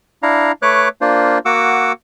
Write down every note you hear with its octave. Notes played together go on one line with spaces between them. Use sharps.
D4 E4 F5 A#5
A3 B4 C#5 D6 F#6
A#3 D4 F4 C5
A#3 F#4 F#5 D6 E6